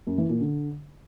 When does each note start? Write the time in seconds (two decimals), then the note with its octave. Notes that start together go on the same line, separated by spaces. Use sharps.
0.07 F#2
0.18 E3
0.29 A#2
0.40 D3